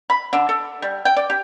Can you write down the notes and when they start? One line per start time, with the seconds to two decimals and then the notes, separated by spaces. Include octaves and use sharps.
0.10 B5
0.33 D3
0.49 A4
0.82 G3
1.05 G5
1.16 D5
1.30 G4